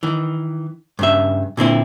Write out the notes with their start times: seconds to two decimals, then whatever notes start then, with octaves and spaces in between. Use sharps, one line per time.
0.03 D#3 E3
0.99 G2 C#3 E5
1.57 A#2 D3 C4 E4